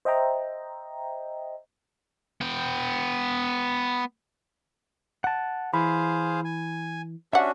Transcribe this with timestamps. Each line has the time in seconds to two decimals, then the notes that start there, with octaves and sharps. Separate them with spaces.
0.05 C5 D#5 E5 G5 A#5
2.41 B3 G5
5.24 F#5 A5
5.74 E3 G#4 C5 F5 B5
6.45 G#5
7.33 G3 C#4 D4 F#4 E5 F#5